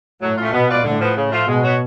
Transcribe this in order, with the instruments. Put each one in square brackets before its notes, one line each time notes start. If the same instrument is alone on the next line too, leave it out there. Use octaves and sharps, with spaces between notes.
[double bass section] A2 [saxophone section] F#3
[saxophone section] A3 C#4 F4
[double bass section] B2 [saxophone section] B3
[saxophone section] F4 B4 D5
[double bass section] A2 [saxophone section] D3
[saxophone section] F3 B3
C#3
F3 A3 F4
[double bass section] B2 [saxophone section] G#3
[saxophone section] B3 F#4 C#5